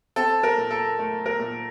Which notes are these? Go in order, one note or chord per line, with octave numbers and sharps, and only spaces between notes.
C4 A4
A#4
A#2
A4
A3
A#4
A#2